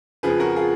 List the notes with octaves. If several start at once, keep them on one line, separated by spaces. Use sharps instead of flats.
F2 C#3 F3 G#4 B4
F#4 A#4
F4 G#4